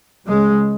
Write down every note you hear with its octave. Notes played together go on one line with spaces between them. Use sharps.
C#2 C#3 G#3